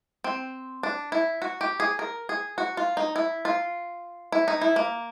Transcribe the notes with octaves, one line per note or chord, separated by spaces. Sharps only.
C4
D4
E4
F#4
G4
G#4
A#4
G#4
F#4
F4
D#4
E4
F4
E4
D#4
E4
A#3